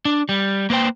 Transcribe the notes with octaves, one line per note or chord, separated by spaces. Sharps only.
D4
G3
A#3 B4 C5 G5